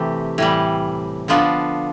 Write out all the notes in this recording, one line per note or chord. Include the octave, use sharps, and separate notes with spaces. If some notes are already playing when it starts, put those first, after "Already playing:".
Already playing: C3 E3 A3 G4
A2 E3 G3
D3 F3 B3 D4 F4